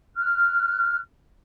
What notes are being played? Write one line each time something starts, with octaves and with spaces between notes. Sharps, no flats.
F6 F#6